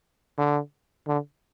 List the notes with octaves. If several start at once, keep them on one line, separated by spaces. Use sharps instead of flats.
D3
D3